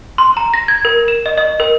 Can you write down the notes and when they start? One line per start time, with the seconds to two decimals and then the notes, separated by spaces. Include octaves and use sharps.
0.18 C6
0.37 A#5
0.54 A#6
0.68 G#6
0.85 A#4
1.08 E7
1.26 D#5
1.38 D#5
1.60 A#4